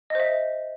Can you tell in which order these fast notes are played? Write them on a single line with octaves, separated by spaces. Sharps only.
D#5 C5 E5